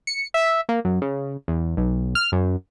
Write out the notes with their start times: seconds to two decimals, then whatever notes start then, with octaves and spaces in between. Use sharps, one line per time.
0.07 C#7
0.34 E5
0.69 A#3
0.85 F#2
1.02 C#3
1.48 E2
1.77 B1
2.15 F6
2.32 F#2